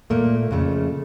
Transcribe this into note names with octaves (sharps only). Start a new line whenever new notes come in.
A#2 A3 A#3
F2 C#3 A3